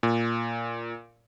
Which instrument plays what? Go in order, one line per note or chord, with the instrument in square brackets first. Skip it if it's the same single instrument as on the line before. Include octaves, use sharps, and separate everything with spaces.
[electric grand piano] A#2